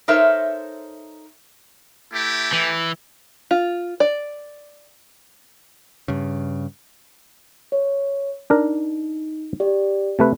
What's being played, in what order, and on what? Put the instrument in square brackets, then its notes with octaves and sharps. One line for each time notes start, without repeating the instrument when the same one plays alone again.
[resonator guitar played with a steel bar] D#4 A4 A#4 C5 C#5 E5
[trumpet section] A3 E4 G4
[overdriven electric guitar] E3
[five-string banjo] F4
D5
[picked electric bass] G2 C#3
[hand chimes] C#5
[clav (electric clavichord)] D4 A#4 [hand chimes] D#4
[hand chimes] G4 D5
[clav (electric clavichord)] C3 A3 B4